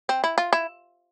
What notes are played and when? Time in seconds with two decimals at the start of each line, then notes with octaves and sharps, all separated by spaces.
0.09 C4
0.24 E4
0.38 F4
0.53 E4